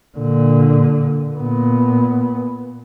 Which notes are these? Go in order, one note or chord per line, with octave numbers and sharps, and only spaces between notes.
A#2 D3
A#2 B3